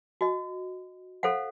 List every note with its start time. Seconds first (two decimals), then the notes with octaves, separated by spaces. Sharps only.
0.21 F#4 D#5
1.23 A4 C5 F5 F#5